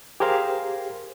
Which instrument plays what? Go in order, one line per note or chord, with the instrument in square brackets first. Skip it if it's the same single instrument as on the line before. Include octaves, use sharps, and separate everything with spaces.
[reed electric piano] G4 G#4 A#4 C5 F5